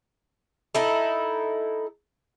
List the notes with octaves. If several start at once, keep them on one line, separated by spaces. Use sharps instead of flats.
D#4 E4 A4